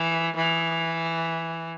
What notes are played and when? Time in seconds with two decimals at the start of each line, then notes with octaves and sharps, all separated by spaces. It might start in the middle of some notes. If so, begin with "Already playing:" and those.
Already playing: E3
0.36 E3